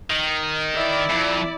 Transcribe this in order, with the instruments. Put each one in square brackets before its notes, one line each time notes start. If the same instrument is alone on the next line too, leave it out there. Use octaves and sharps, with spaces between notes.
[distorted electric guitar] D#3
[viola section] E4 D5
[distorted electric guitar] F2